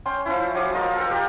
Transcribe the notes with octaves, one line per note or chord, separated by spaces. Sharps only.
C#4 G5 C6
F3 C#4 E4
F3 F#3 D6 D#6
F4 A#4 D#5
A4 A#4 G5
G4 A#5